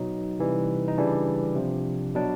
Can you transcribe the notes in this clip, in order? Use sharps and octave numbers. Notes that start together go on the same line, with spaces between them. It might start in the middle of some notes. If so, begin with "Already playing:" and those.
Already playing: B2 F#3 D#4
C3 E3 G3
D#4
C#3 E3 G3 D4
C3 F3
B2 F#3 D4